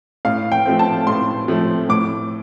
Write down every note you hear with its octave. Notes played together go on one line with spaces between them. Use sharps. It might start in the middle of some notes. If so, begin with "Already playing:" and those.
A2 F5
G5
F3 A3 C4
A5
A2 C6
F3 A3 C4
A2 D6